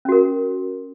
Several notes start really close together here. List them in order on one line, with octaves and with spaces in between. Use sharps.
C#4 F#4 A#4